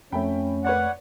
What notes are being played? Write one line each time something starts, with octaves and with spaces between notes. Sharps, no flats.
F2 A3 C#4 G5 B5
B4 C#5 D5 F#5